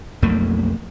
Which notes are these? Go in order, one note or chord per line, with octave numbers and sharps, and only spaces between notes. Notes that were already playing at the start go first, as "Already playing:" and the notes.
B1 F2 A3 A#3